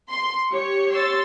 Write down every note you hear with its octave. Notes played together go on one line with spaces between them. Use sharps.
C6
G4 C#5 C#7
C6 E6 A6